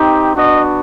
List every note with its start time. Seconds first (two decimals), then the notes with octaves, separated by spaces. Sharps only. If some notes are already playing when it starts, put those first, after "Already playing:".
Already playing: C4 D#4 G4
0.35 B3 D4 F#4 D#5